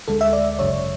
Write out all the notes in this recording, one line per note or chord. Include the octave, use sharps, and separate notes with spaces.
D2 D3 G#3 A4
E5
D5
G#1 F#2 C#3 F#3 C#5